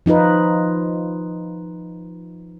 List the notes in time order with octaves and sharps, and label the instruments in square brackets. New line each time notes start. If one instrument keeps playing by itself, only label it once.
[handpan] F3 D#4 F4 B4